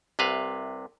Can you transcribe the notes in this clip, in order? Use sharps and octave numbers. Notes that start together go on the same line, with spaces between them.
C2 C3 B4 F5